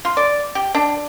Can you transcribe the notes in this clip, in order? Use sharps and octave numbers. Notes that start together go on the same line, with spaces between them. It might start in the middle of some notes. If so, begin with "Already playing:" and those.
F4
D5
G4
D4